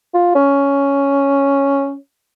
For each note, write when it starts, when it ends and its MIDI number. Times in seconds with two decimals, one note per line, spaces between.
0.14 0.32 65
0.35 1.94 61